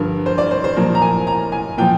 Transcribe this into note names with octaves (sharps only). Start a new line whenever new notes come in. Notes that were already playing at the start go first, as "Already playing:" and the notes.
Already playing: G2 D3 F3 A#4
C5
D5
C5
C5
A#2 F3 A#4
A#5
G#5
A#5
G#5
A#2 F3 G5